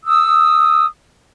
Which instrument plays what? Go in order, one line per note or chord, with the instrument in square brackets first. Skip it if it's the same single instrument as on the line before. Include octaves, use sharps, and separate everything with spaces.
[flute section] D#6 E6